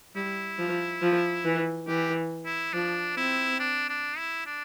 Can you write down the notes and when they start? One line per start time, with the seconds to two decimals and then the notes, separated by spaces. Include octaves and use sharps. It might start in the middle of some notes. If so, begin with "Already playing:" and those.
0.15 G3 E4
0.59 F3
1.02 F3
1.45 E3
1.87 E3 G4
2.45 E4
2.73 F3 D4
3.17 C4 E4
3.60 D4
3.89 D4
4.18 E4
4.46 D4